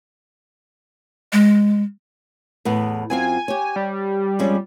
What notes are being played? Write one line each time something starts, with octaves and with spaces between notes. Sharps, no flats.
G#3
E2 A2 B3
F#2 C4 F4 G#5
G4 C#5
G3
F2 G#3 C#4